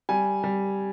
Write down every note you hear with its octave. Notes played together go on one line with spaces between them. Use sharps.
G3 G#5
G3